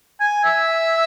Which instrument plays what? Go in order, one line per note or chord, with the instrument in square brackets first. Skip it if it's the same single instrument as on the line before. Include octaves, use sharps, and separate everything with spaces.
[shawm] G#5
E5